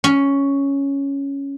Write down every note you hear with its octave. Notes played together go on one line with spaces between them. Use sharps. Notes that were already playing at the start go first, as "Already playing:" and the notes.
C#4